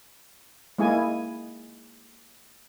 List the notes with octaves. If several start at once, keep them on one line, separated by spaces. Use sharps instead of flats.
G#3 A#3 E4 G#4 G#5